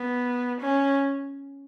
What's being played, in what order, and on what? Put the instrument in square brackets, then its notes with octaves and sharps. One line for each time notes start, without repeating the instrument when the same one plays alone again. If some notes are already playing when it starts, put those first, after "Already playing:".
Already playing: [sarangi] B3
C#4